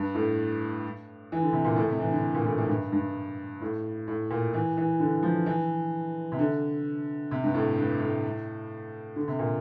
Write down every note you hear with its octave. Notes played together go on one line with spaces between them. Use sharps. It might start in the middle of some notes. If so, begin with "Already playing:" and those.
Already playing: G2
A2
E3
D3
C3
A#2
A2
C3
E3
D3
A#2
A2
A2
G2
G2
A2
A2
A#2
E3
E3
D3
F3
E3
C3
D3
C3
G2
A2
G2
A2
D3
C3
A#2